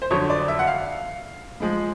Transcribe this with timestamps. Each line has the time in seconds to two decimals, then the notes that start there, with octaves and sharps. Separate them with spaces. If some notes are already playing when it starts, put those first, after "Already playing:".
0.02 C5
0.10 F2 D3 F#3 C#5
0.30 D5
0.48 E5
0.59 F#5
0.67 F5
1.60 G#2 F3 G#3